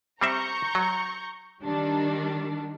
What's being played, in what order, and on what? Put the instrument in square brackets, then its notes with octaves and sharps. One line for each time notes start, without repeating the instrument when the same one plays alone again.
[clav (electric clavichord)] G3 C4 E5 [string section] A#5 C#6 G6
[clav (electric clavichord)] F#3
[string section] D#3 G3 D4